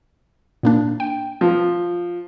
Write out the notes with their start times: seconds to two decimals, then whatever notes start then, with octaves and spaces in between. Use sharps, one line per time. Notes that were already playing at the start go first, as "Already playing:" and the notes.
0.63 A#2 A#3 D4
1.00 G5
1.41 F3